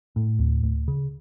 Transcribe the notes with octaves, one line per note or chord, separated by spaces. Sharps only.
A2
D2
D2
C#3